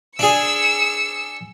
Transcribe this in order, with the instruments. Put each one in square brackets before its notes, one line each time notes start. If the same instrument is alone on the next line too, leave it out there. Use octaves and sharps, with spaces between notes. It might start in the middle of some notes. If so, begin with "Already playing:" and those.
[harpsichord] D4 G#4 [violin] E6 C#7